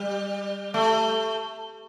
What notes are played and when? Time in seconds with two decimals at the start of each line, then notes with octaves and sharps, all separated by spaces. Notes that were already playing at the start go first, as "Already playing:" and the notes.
Already playing: G3
0.74 A3